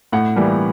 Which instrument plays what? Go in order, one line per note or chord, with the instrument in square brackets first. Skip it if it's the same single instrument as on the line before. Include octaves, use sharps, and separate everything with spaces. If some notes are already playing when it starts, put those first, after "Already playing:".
[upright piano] A2 F#5
E3 G3 A#3